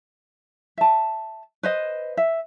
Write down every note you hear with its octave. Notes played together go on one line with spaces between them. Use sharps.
E5 A5
B4 C5 D#5
E5